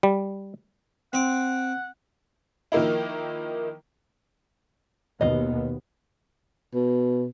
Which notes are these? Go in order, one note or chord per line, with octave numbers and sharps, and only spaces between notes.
G3
C4 F#5 D6
D#3 F3 A#3 D#4 E4
D#2 B2 B3 F4 D#5
B2